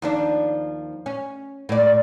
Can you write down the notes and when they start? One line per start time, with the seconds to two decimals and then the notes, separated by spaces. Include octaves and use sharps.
0.02 D#2 F3 D4
1.06 C#4
1.69 A2 D5